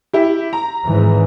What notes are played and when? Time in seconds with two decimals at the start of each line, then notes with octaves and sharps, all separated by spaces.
0.13 E4 G4
0.53 A#5
0.85 G#1 G#2 E3